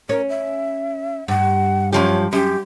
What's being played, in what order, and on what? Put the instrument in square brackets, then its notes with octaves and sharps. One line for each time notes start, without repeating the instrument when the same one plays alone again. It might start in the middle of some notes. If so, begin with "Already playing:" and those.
[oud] C#4 [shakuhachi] A#4
[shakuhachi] E5
[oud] G2 [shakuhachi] F#5
[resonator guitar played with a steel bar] F#2 F3 G4 [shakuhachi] C#5
[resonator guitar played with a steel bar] F#2 [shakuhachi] G4